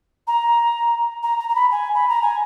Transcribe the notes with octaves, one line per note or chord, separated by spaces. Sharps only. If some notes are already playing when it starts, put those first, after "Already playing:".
A#5
A#5
A#5
A#5
B5
G#5
B5
A#5
G#5